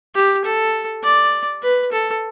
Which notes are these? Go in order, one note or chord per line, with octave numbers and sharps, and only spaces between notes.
G4
A4
D5
B4
A4